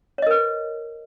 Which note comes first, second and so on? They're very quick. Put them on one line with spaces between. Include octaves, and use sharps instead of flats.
C#5 D#5 A#4 B4